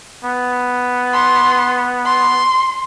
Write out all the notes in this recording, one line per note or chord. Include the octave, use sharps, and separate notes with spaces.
B3
C6
C6